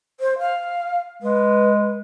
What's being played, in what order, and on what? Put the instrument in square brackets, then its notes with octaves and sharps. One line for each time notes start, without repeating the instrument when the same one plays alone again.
[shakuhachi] C5
F5
[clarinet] G#3 [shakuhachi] B4